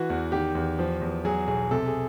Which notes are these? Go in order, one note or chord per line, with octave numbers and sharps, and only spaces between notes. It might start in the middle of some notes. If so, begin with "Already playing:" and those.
Already playing: E3 F#4
E2
D#3 G4
E2
F3
E2
F#3 G#4
B1 G#4
C3 A4
G#4